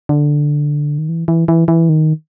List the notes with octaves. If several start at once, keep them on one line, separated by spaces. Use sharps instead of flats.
D3
D#3
E3
E3
E3
E3
D#3